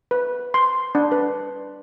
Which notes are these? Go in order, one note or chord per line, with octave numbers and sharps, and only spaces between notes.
B4
C6
D4
B4